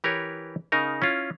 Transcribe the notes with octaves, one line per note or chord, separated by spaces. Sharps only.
E3 G4 A#4 B4 C#5
C#3 D#4 A#4
C#4 E4 F4